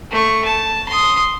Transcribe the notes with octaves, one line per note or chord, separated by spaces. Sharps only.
A3 C#6
A5
C6 D#6